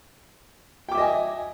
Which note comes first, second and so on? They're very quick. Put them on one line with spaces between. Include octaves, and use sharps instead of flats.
G5 D6 E5 D#5 G#5